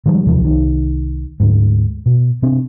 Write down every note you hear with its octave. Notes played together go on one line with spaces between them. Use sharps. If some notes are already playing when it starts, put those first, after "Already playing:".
D#3 F3 G3 G#3
D#2 C3 E3 F3
C2 D#3
D2 G#2
B2
C3 C4 D4